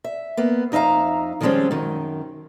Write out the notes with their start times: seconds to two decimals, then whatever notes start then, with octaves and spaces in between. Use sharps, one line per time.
0.04 E5
0.37 A#3 B3
0.72 F2 D#4 E5 F5 A#5
1.41 D#3 F3 G3 G#3 C4 C#4
1.71 F#2 D#3